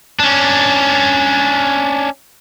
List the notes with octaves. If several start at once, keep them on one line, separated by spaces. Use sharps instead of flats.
C#4 D4